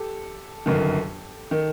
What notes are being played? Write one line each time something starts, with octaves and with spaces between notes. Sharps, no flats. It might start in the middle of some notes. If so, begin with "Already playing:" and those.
Already playing: G4 A4
G1 F#2 D#3
D#3